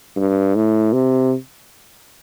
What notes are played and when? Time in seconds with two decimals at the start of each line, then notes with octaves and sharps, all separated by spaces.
0.16 G2
0.55 A2
0.93 C3